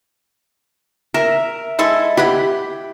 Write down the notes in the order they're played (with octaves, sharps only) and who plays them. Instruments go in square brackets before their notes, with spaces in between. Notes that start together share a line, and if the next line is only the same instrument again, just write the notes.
[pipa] A#4 [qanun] E5
[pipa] G#3 E4 A4
[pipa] E4 F#5 B5 [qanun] G4